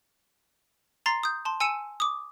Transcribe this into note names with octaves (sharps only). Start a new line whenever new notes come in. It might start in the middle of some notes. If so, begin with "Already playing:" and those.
A#5 C6 A6 C7
D#6 G6
A5 C6
G#5 E6 C#7 D#7 E7
D6 D#6